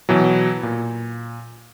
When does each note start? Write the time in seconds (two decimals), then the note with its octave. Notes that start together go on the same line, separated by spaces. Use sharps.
0.09 B2 E3 F#3
0.63 A#2